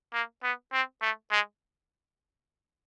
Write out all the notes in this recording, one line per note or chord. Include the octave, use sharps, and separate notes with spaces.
A#3
B3
C4
A3
G#3